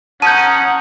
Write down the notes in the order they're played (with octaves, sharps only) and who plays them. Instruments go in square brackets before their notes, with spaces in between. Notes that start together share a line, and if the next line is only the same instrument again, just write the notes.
[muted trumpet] C#4 [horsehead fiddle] F#5 A#5 [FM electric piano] A5 D#6 [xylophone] G6 D#7